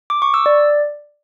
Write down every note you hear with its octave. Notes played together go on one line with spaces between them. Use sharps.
D6
C#6
E6
D5